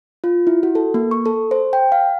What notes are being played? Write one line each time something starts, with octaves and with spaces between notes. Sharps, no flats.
F4
E4
F#4
A4
A#3
C#6
A4
C5
G5
F5